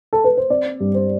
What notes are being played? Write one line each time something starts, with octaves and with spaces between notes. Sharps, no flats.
A4
B4
C5
C4 D5
G2
C5